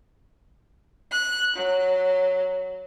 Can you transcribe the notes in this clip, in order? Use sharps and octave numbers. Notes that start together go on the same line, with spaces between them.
F#6
F#3